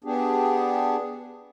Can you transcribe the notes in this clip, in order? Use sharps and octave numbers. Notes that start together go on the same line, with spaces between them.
B3 D4 G4 G#4